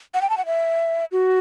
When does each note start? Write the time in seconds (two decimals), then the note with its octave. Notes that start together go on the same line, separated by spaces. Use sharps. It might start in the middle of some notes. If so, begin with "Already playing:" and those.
0.14 F#5
0.22 G5
0.30 A5
0.38 F#5
0.46 E5
1.12 F#4